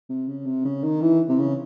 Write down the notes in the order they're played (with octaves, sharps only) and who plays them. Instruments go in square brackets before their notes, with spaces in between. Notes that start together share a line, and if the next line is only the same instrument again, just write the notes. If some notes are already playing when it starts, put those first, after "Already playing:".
[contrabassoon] C3
C#3
C3
C#3
D#3
E3
C3
C#3